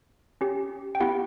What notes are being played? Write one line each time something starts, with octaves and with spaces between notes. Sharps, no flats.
C#4 G4
G5
B3 E4 G4 F#5